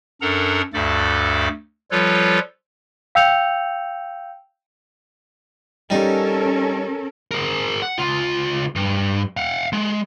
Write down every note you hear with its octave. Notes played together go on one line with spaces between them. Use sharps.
F#2 D4 A4 A#4 F#5 A#5
D2 G2 A3 A4 D5 D6
F3 G3 F4 A4 B4 C#5
F5 G5 E6 G6 C#7 F7
G3 C#4 D#4 A4 A#4
G#4 A#4
F#5
C#2 F4
G2
F5 F#5
G#3